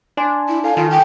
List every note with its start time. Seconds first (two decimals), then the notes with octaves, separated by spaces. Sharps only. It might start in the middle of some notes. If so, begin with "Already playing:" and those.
0.17 D4 D5 G#5 C6
0.49 E4
0.64 A4 F5 G#5 A5
0.77 D#3 F4
0.90 G5